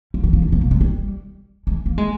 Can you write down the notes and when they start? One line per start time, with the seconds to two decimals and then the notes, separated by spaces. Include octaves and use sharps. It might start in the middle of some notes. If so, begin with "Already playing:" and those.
0.14 F3
0.23 D#3
0.33 F3
0.42 D3
0.52 C3
0.61 A#3
0.71 G#3
0.81 G3
1.67 G#3
1.86 A#3
1.98 G#3